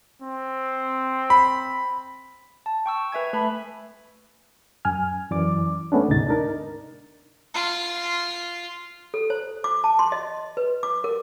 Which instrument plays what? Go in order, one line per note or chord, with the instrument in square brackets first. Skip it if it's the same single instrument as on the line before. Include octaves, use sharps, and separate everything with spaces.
[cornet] C4
[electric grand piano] B5
[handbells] A5
G5 C#6 E6
B4 E5 G#5 G#6
A3 B4 A5 B5
[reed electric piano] F#2 G#5 F6
F#2 E3 D5 D6
A3 B3 C#4 D4
D2 G#2 C3 D#4 A6
D4 D#4 A#4
[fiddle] F4
[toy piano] A4
C5
D6
A5
C6
D#5
B4
D6
A#4